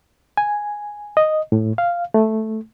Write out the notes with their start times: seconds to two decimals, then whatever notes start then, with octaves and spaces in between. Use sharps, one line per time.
0.37 G#5
1.17 D#5
1.52 A2
1.78 F5
2.14 A3